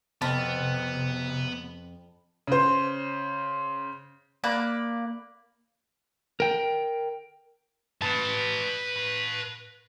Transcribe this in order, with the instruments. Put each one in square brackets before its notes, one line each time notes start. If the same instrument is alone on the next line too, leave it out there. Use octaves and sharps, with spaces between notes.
[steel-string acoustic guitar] F2 [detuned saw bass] C3 [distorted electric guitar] B3 [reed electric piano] A5 B5 F6
[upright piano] C#3 C5
[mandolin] A#3 D5 B5 F#6
[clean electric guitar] A#4 G5
[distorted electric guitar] B4 A5